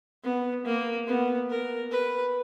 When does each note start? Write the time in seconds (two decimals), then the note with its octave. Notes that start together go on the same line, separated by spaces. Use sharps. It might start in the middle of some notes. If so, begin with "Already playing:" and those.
0.24 B3
0.65 A#3
1.07 B3
1.50 A#4
1.91 B4